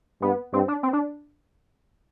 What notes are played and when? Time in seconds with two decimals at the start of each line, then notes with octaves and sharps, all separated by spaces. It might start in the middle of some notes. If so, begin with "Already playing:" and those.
0.22 G2 B3
0.53 G2 C4
0.68 D4
0.83 C4
0.93 D4